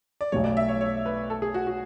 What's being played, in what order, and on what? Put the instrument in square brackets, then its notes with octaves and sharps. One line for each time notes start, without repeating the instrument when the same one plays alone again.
[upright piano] D5
[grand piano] B1 B2 A3 [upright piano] C#5
[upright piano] D5
E5
C#5
C#5
B4
A4
G#4
F#4
F#4